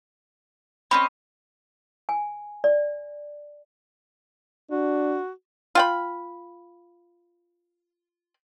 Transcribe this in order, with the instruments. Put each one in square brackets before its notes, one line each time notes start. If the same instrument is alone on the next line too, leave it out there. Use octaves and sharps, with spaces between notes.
[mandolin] C4 C#4 D#5 [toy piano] B5
[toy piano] G#5
D5
[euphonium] D4 [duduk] F#4
[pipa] F4 G5 B5